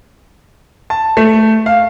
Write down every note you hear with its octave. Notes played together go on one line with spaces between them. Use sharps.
A5
A3
F5